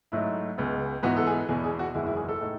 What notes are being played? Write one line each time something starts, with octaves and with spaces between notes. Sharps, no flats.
G#2 F#3 A3 D#4 E4
C#2 C#3 G#3 B3
G#2 E3 B3 D#4 F#4
A4
G#4
E2 B2 G#3 G#4
G#4
F#4
F#1 E2 D#3 G#3 E4
E4
G#4
A4
A2 G#3 D#4